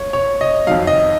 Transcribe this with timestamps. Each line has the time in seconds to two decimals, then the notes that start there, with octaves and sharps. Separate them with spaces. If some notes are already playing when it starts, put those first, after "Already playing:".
Already playing: C#3 C#5
0.13 C#5
0.41 D#5
0.67 F2 D#3 F#3 F5
0.87 D#5